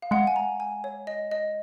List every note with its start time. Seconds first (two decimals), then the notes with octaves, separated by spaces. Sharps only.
0.02 F5
0.11 G#3 F#5
0.27 G#5
0.36 A#5
0.60 G#5
0.84 C#5
1.07 D#5
1.31 D#5